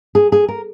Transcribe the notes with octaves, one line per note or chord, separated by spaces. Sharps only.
G#4
G#4
A#4